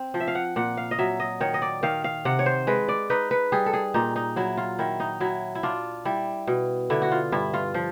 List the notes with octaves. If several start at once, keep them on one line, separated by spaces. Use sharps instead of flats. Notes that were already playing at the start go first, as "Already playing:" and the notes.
Already playing: C4
F3
E5
F5
F#5
A#2 F#5
F5
D#5
F#3 E5
D#5
D#3 C#5
D#5
D5
D#3 F5
F5
C3 F#5
C#5
C5
G#3 B4
D5
D#4 B4
B4
G3 G#4
A4
G#4
A#2 D#4
D#4
F#3 E4
F4
D#3 E4
D#4
F#3 E4
E4
D4 F4
G3 E4
B2
D3 E4
F#4
F4
G2 E4
F4
F3